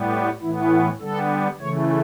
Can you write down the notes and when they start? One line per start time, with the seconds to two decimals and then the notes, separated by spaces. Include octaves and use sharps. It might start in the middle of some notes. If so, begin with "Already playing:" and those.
Already playing: A2 G3 B3
0.11 G4
0.41 A2 E3 B3 E4
0.70 E4
1.00 D3 G3 B3 A4
1.60 C#3 E3 A3 C#5